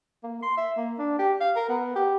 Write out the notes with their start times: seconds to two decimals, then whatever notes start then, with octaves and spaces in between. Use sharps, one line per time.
0.23 A#3
0.43 C6
0.58 E5
0.77 A#3
0.99 D4
1.19 G4
1.41 F5
1.56 A#4
1.69 B3
1.96 G4